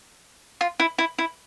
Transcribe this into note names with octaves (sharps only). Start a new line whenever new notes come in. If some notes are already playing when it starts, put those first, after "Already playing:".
F4
E4
E4
E4